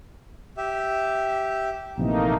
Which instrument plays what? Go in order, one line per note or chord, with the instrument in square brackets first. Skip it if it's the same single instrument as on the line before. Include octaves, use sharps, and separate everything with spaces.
[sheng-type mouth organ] G4 E5
[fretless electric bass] A#1 C3 E3 [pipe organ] A3 A#3 D#4